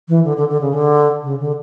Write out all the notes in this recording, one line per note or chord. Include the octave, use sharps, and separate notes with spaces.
E3
D3
D3
D3
C#3
D3
C#3
D3